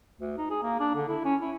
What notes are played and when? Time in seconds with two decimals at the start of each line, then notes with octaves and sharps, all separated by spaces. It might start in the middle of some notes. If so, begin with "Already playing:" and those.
0.20 D2
0.38 D#4
0.50 G#4
0.63 A#3
0.80 D4
0.95 D3
1.08 E4
1.25 C#4
1.42 E4